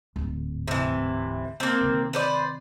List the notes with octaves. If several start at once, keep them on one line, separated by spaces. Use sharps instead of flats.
D1 G#2
C3 E3
A#3 C4
C3 D#3
B4 C5 D5